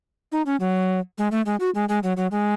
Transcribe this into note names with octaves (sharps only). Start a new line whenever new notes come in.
D#4
C#4
F#3
G#3
A3
G#3
F#4
G#3
G#3
F#3
F#3
G#3